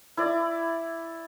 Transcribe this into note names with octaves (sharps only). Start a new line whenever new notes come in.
E4 D5